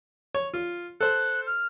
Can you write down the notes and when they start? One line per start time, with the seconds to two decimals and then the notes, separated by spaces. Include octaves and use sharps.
0.35 C#5
0.54 F4
1.01 A4 C5 F#6
1.47 F6